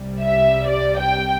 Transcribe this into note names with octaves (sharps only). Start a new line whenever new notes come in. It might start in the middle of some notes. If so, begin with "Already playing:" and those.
Already playing: C2 C3 G3
E5
D5
G5